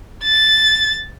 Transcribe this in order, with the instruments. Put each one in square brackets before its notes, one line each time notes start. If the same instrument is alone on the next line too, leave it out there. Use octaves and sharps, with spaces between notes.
[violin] A6